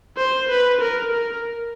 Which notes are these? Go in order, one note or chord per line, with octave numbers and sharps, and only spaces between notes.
C5
B4
A#4
A#4